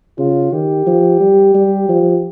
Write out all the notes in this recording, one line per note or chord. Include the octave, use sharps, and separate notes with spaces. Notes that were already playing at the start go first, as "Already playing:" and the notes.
C#3 F4
D#3 G4
F3
G3
G3
F3